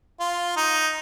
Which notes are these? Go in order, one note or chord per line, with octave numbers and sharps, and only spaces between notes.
F4
D#4